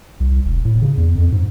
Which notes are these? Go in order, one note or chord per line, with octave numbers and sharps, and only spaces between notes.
C2
E1
A2
C#3
E2
F2
G#2